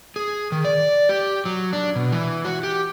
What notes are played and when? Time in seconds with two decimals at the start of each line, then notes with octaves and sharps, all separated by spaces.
0.16 G#4
0.52 D#3
0.65 D5
1.09 G4
1.45 F#3
1.73 D4
1.96 B2
2.12 E3
2.45 F#4
2.63 G4